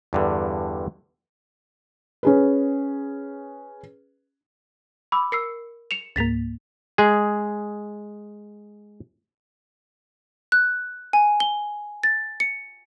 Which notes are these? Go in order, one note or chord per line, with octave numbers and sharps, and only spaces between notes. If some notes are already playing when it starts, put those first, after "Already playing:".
E2 G2 D3
C#4 G#4 B4
B5 D6 E6
A#4 E6 C7 C#7
C#7 E7 F7
C#2 G#2 A#3 A6 B6 F7
G#3 G#4
F#6
G#5
G7
A6
C#7